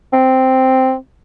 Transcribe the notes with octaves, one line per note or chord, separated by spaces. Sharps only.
C4